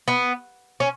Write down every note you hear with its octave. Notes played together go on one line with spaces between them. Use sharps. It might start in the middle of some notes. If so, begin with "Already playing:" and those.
B3
C#4